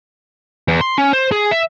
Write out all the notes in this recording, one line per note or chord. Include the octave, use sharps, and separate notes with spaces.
E2
C6
C#4
C5
G#4
E5